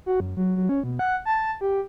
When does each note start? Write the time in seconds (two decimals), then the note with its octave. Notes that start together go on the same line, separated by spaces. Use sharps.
0.06 F#4
0.20 F#2
0.37 F#3
0.56 F#3
0.69 C#4
0.84 B2
0.99 F#5
1.25 A5
1.61 G4